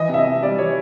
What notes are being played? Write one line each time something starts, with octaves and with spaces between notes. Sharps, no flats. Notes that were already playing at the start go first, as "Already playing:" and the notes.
Already playing: E3 D#5
C3 E5
D#5
C3
G3 D5
E3 C#5